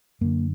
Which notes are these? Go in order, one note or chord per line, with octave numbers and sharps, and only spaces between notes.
F#2 D3 A#3